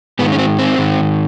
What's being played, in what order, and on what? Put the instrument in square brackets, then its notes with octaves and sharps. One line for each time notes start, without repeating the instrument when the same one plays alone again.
[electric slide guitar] G#2 B3
D#3
C#4
C4
C4
G#2 D#3